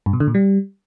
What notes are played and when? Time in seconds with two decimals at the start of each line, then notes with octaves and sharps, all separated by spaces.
0.06 G2
0.13 B2
0.20 D3
0.27 A#2
0.35 G3